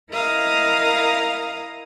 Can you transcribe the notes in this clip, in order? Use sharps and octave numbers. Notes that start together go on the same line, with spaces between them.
E4 A#4 D#5 F5 A#5 D#6